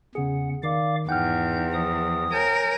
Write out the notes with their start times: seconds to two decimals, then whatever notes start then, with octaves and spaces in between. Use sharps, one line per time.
0.15 E2 C#3 G#4 F#5
0.63 D#3 D5 F5 D6
1.09 E2 G#2 F#5 G5 F6 G6
1.74 F3 D#6
2.32 A#4 C#5 G#5 G6